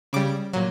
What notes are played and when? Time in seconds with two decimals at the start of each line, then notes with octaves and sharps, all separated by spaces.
0.13 C#3 G3 D6
0.53 A#2 F#3